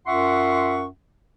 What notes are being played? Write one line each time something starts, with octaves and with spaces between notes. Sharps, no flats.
F#2 F4 E5 F#5 C6 C#6